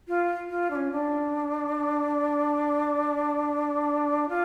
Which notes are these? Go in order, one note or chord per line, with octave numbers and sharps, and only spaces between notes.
F4
F4
D4
C#4
D4
F4